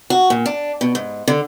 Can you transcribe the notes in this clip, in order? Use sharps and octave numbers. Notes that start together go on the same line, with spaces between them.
F#4
A#2
D4
B2
G#2
D3